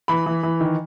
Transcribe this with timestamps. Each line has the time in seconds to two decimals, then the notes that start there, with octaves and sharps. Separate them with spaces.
0.08 E3 B5
0.26 E3
0.43 E3
0.60 D#3